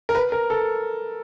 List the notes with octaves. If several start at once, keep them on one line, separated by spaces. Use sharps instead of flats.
A#4
B4
A#4
A4